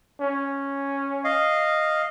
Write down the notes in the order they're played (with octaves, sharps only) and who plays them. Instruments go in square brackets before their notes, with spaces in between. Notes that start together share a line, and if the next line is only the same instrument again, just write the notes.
[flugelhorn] C#4
[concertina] D#5 F5